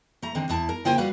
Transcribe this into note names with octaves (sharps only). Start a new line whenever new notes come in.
A3 A#5
D3 D#3 C4
E2 E4 A5
A#4
C#3 A#3 F4 C5 G5 G#5
G3 F#4 B4 F5